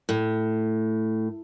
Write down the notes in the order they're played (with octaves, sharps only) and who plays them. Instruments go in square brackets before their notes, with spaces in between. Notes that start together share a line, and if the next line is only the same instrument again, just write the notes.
[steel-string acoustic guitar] A2